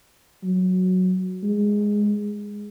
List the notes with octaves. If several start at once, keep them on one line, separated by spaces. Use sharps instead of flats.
F#3
G#3